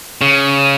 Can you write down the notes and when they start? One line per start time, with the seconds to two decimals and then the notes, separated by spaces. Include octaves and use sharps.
0.21 C#3